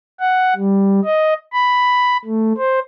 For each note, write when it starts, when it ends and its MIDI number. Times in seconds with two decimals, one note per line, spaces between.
0.20 0.54 78
0.56 1.00 55
1.04 1.34 75
1.53 2.17 83
2.25 2.53 57
2.57 2.79 72